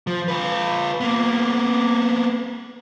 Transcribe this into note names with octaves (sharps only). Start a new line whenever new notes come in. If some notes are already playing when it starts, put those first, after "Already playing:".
F3
F4 B4
A#3 B3